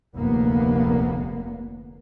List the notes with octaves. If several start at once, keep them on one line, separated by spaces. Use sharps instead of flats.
F1 D2 A#3 B3